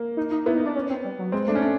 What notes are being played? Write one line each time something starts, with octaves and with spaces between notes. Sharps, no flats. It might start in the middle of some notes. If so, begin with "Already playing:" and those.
Already playing: A#3
D#4
D#4
B3 E4
D#4
D4
C#4
C4
G3
F#3
G#3 C4
A3 D4
C#4
D4